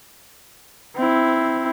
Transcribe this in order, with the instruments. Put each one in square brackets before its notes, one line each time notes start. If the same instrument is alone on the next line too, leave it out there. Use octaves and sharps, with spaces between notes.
[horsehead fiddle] C4 E4